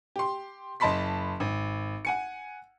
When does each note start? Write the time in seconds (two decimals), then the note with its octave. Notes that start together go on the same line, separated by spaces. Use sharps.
0.16 G4 C6
0.80 F#1 D#5 A5 B5 C6 B6
1.40 G#1
2.05 F#5 G#5 C#7